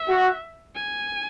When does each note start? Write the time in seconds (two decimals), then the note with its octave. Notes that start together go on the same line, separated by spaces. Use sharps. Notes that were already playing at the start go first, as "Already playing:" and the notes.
Already playing: E5
0.09 F#4
0.75 G#5